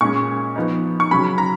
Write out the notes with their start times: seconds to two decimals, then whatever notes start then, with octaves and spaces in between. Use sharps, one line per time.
0.01 A#2 G#3 C#4 C#6
0.56 F3 B3 D#4
1.00 C#6
1.11 C#3 F#3 C#4 B5
1.38 A#5